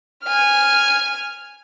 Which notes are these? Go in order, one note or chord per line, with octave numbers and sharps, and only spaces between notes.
G#5 F6